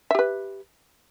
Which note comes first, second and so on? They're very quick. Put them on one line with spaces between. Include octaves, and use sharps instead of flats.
E5 G4 B4